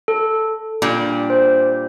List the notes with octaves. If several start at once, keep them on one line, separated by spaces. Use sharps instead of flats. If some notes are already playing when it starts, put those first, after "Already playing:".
A4
A#2 G3 D4
C5